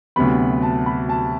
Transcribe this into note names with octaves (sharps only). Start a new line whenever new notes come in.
D2 C3 F#3 B3 B5
A5
B5
A5